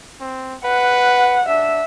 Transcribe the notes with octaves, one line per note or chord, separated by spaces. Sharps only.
C4
B4 F#5
D4 E5